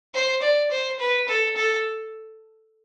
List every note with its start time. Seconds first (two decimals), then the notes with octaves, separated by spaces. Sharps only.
0.14 C5
0.42 D5
0.71 C5
0.99 B4
1.28 A4
1.56 A4